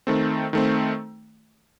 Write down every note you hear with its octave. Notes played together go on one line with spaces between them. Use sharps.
D#3 A3 C4
D#3 A3 C4